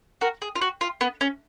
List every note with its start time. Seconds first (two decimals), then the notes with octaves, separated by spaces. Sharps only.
0.21 F#4 A#4
0.42 G#4
0.55 F4
0.61 F#4
0.81 F4
1.01 B3
1.21 C#4